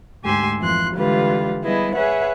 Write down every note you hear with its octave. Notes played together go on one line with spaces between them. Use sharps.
D2 G#2 G4 G#5 C6 E6
F2 E3 F4 C6 F#6
D3 E3 G3 G#3 F4 B4
G3 B3 E4 G#4 D#5
G#4 B4 C#5 E5 F#5